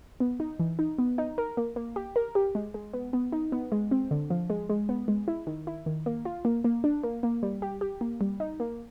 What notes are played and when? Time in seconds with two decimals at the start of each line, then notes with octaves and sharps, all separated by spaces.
0.20 B3
0.40 D#4
0.60 E3
0.79 D#4
0.98 B3
1.18 D#4
1.38 A#4
1.57 A#3
1.76 A#3
1.96 G4
2.16 A#4
2.35 G4
2.55 G#3
2.74 G#3
2.93 B3
3.13 B3
3.32 D#4
3.52 B3
3.72 G#3
3.91 C4
4.11 D3
4.30 F3
4.50 G#3
4.69 G#3
4.89 B3
5.08 G#3
5.28 E4
5.47 D#3
5.67 E4
5.86 D#3
6.06 A#3
6.25 F4
6.45 A#3
6.64 A#3
6.84 D4
7.04 A#3
7.23 A#3
7.43 G3
7.62 G4
7.81 G4
8.01 A#3
8.21 G3
8.40 D#4
8.60 A#3